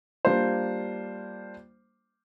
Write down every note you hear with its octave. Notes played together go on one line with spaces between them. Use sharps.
G3 A#3 D4 F4 C5